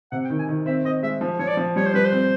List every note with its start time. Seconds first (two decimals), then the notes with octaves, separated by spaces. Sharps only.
0.12 C3 F#5
0.25 G5
0.30 D#3
0.39 G#5
0.49 D#3
0.66 C4 E5
0.85 C4 D#5
1.03 G#3 E5
1.21 F3
1.39 F3 C#5
1.48 D5
1.57 F3
1.76 G3 C#5
1.86 C5
1.94 G3 B4
2.05 C5
2.12 C4